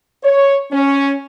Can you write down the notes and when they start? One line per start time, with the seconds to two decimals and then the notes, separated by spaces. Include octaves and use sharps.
0.23 C#5
0.71 C#4